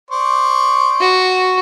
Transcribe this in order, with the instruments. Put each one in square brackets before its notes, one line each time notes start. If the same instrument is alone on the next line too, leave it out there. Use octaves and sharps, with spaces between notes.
[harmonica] C5 D5 C#6
[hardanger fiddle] F#4